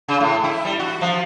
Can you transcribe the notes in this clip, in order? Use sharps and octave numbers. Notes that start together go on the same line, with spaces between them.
C#3
A2
E4
G3
F#4
F3